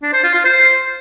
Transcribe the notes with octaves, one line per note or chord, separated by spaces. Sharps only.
D4
C5
F4
F4
C5